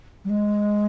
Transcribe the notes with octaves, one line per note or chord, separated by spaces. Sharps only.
G3
G#3